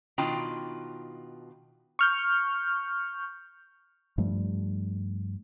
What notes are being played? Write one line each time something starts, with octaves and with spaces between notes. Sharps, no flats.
B2 D#3 D4 F4 G5 A#5
C#6 F6 G6
G2 F3 G3 A3